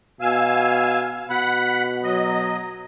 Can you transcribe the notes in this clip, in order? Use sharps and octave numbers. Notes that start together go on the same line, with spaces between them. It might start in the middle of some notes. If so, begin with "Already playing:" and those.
B2 F5 G#5 E6
B2 F#5 B5
F#3 D#5